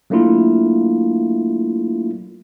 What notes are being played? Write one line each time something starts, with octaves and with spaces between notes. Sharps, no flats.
F#3 A3 A#3 D4 E4 F4